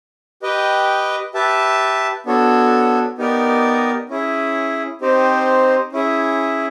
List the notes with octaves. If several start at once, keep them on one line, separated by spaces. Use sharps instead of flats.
G4 B4 D#5 G5
G4 B4 E5 A5
B3 D4 F#4 A4 C#5
B3 D#4 G4 A#4 D5
C#4 E4 G#4
C4 D#4 G4 C5
C#4 E4 G#4